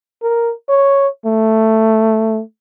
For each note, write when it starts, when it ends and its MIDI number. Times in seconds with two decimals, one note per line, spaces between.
0.23 0.53 70
0.69 1.08 73
1.26 2.42 57